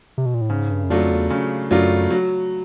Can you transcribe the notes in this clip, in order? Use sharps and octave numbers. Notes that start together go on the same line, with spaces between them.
C3
B2
A#2
A2
G#2 C#3
G2
F#2
F2 F#3 A3 D4 F4
E2
C#3
F#2 F#3 A3 D4 F4
F#3